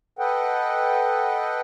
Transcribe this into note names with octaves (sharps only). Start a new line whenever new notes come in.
A4 B4 D#5 F#5 G5